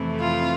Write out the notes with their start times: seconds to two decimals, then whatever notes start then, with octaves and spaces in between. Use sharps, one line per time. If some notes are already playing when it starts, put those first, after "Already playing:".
Already playing: F2 C3 E3 A3 E4
0.20 F4